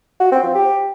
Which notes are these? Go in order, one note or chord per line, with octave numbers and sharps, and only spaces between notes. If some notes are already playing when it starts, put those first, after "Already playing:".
F#4
C4
F3
G4